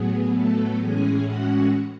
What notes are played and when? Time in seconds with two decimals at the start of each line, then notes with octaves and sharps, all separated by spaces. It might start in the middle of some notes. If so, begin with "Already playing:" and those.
Already playing: A2 F#3 B3 G#4
0.32 A3 A4
0.78 A2 E3 G#3 C#4 G#4 G#5
1.25 F#4 F#5